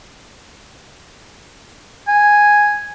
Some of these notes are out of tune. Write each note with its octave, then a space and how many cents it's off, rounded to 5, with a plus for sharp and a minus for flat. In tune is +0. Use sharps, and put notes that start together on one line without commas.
G#5 +0